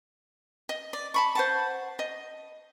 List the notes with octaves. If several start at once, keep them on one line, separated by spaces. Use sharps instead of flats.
D#5
D5
A5 B5 C#6
C5 F#5 A5
D#5